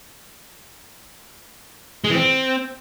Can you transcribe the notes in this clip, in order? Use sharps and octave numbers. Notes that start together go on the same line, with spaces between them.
G#3
E3
C4